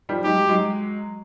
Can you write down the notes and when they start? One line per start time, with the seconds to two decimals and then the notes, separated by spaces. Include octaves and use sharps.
0.09 F3 G3
0.24 F#3 G#3 G4
0.48 F#3 G#3